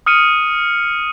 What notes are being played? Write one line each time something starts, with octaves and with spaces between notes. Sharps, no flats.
D#6 F6 C#7 D#7